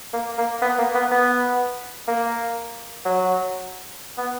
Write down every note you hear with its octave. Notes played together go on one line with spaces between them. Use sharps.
A#3
A#3
B3
A#3
B3
B3
A#3
F#3
B3